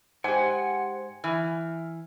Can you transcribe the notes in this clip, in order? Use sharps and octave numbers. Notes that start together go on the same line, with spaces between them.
G#2 G4 C5 F#5 G#5
E3 F6